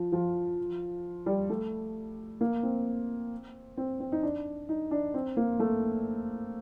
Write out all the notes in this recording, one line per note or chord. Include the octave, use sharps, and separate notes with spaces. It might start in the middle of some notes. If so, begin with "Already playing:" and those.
Already playing: F3
F3
G3
A3
A#3
C4
C4
C4
D#4
D4
D#4
D4
C4
A#3
A3